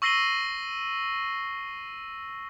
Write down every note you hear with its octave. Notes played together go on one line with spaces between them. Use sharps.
C#6 E6 A#6 C7 D#7 G7